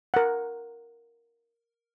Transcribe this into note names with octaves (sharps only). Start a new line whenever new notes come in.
A#4 F#5